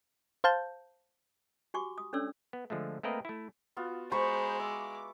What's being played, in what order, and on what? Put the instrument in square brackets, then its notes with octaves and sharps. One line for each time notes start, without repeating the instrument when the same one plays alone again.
[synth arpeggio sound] C5 F5 A5 G6
[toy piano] F#4 G4 G#5 C#6 D6
D#6
C#4 D4 A4 C#5 D5 E6
[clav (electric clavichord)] B3
D3 F3 G#3 A3
A3 A#3 C4 A#4 B4 D#5
A3 E4
[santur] B3 F4 F#4
[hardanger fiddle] G#3 [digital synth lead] C5 [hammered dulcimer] A#5 B5 C#6
[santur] E5 [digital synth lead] D6